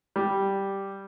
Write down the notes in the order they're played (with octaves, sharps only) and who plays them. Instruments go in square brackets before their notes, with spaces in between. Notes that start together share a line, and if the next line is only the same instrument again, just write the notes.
[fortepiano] G3